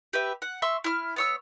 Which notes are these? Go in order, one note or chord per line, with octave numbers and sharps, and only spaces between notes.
G4 B4 E5
F#5
E5 C6 C#6 E6
E4 F6
B3 C#5 E6